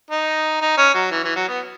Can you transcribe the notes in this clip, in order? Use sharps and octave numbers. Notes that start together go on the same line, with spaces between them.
D#4
D#4
C#4
F#3
E3
E3
F#3
B3